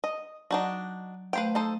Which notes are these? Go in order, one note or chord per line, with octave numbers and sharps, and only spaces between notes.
D#5
F#3 D4 D#4 F#4
A3 B4 C5 F5 G5
D#4 A4 C5